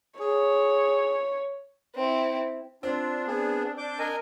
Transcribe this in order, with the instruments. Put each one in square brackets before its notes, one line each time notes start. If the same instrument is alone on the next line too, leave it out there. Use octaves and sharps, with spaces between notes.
[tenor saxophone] G#4 [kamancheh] C#5
[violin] C4 E4
[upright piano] C4 [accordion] D4 [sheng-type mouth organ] F4
[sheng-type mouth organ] B3 G#4
[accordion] D4 G6 [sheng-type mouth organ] D6
[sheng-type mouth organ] A#4 D#5 G#5